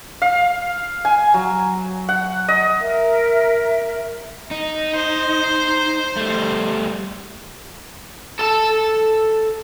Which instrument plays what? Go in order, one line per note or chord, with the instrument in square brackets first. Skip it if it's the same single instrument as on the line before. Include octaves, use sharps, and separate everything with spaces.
[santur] F5
G#5
F#3
F#5
D#5
[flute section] A#4 E5
[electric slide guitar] D#4
[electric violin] C5
[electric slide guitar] G3 A3
[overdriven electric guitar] A4 A5